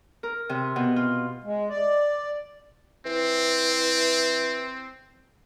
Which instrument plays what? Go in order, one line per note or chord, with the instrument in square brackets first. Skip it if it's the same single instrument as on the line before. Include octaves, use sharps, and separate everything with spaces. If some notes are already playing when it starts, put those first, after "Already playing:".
[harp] A#4
C3
B2
F4
[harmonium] G#3
D5
[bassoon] E3 [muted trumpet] C4